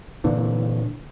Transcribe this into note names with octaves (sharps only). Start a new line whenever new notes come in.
A#2 D3 E3